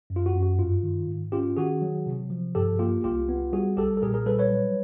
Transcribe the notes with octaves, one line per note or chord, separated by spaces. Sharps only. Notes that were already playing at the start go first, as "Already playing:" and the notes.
F#2
F4
F#4
F#2
F#4
G2 F4
D#3
G#2
C#4 F4 G4
D#3 F#4 G#4
F#3
C3
F3
G2 G4 A4
A#3 F4 G4
C2 F4 G4
B3
G3 F#4 G#4
B1 G4 A4
A4
A#2 G#4 A#4
G#4 A#4
G3 A4 B4
B4 C#5
F#3